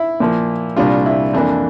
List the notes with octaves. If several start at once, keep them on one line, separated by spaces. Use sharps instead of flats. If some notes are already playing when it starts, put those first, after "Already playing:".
Already playing: E4
A#2 F3 A#3
C2 A#2 G3 D4 F4
E4
F2 E3 A#3 D4